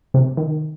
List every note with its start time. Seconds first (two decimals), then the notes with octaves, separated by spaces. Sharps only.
0.14 C3
0.37 D#3